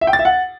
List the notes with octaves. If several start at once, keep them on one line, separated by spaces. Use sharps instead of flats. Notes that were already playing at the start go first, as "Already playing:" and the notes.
E5
G5
A6
E5
F#5